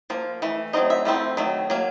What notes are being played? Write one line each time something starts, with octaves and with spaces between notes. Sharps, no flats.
F3 A#3
E3 A3
F#3 A3 C4 D#4 D#5
E5
F3 A3 C4 E4
D#3 F#3 A3
F#3 A#3